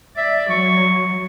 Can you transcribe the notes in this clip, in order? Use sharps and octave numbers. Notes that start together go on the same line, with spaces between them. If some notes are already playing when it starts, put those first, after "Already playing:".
D5 E5
F#3 C#6